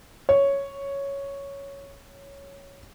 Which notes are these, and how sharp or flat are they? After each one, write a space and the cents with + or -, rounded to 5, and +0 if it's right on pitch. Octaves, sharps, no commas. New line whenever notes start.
C#5 +0